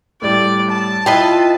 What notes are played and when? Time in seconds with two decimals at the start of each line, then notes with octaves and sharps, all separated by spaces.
0.22 A2 G3 A3 D5
0.71 A5
1.06 E4 F4 B4 D#5 G5